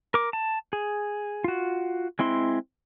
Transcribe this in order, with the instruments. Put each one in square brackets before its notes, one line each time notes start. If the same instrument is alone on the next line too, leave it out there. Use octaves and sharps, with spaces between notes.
[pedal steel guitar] A#4 D6
A5
G#4
F4 F#4
G#3 C4 E4 C6